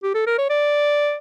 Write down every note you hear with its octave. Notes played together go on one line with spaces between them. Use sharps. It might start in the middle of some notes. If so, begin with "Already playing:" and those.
G4
A4
A#4
C#5
D5